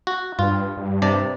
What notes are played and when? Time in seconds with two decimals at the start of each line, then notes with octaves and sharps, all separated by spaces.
0.07 F#4
0.39 G2 F4
0.77 G2
1.02 G2 C3 D5 A5